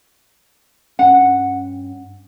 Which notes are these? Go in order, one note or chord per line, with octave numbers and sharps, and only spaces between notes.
G2 C#4 F#5